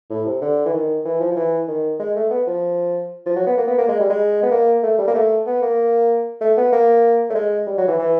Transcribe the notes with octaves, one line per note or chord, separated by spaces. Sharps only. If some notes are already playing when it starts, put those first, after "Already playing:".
A2
C3
D3
E3
D#3
E3
F3
F3
E3
D#3
G#3
A3
B3
F3
F3
F#3
B3
A#3
B3
A#3
G#3
G3
G#3
B3
A#3
A3
G3
A#3
A3
B3
A#3
A3
B3
A#3
A3
G#3
G3
F#3
E3
E3